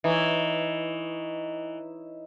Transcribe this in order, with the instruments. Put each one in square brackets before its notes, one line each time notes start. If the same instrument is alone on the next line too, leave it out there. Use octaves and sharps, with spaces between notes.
[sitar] E3 [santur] D#4 C#5